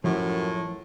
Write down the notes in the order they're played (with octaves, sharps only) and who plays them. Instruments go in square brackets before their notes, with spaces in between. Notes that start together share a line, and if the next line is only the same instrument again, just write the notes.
[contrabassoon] F#2 [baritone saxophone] A2 [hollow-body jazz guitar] F3